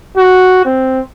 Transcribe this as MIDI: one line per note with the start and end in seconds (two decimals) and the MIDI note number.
0.17 0.62 66
0.65 1.01 60